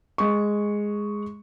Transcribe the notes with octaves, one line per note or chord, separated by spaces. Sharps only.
G#3 C#6